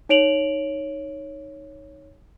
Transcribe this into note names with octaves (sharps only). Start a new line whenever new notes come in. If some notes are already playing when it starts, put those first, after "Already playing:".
D#4 C#5 D7 F7 F#7